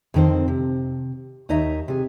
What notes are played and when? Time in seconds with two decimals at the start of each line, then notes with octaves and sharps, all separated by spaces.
0.14 F2 D3 D#3 A3 C4 C5
0.48 C3
1.49 D#2 D#4 C#5 D#5 E5 A#5
1.88 C3 G#4